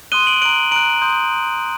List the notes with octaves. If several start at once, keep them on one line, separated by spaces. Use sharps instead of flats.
C6 D#6 F#6 D#7 G7
D7 F#7
A#5 F#6 D7 F#7
A#5 F#6 D7 F#7
C6 D#6 G6